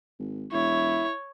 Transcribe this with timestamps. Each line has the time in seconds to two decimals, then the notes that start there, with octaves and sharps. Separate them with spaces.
0.19 G#1
0.53 E1 E4 C#5